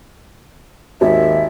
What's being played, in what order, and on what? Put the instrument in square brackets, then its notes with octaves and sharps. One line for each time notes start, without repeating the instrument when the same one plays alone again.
[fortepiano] G#1 [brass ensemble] D#2 [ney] E5